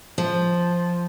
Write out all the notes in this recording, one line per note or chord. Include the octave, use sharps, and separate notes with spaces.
F3